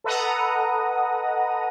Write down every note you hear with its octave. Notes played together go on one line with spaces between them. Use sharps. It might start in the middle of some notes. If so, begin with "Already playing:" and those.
A4 B4 D#5 F#5 A#5 D#6